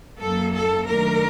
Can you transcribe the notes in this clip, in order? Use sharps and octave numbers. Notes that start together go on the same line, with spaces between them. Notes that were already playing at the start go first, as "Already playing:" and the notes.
F#2 F#3 A#3 A4
A4
D#3 F#3 A3 D4 A#4